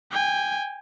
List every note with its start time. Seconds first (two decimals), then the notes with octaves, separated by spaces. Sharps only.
0.11 G5 G#5